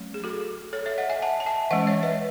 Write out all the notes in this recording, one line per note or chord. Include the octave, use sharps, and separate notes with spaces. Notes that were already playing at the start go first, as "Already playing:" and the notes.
Already playing: F#3 A3 C#4
G#4
F#4 A4
A4 C#5
C#5 E5
D#5 F#5
E5 G#5
F#5 A5
A5
E5 G#5
E3 G#3 C#4 D#5 F#5
C#5 E5
B4 D#5